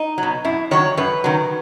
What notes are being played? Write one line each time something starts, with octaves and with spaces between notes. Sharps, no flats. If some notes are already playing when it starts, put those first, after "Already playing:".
Already playing: D#4
F#3
B2
F#2 E4
D#3 F#3 C#5
F#2 B4
D#3 F#3